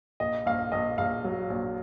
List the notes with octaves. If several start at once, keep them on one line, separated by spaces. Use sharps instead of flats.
A#1 D#5
A#1 F5
A#1 D#5
A#1 F5
F#3
A#1